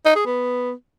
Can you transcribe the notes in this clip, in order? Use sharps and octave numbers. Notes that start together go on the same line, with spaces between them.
D#4
G#4
B3